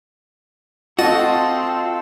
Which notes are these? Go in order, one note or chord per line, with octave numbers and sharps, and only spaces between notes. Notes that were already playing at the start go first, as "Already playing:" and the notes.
C4 F4 F#4 A4 D#5 A5 D#6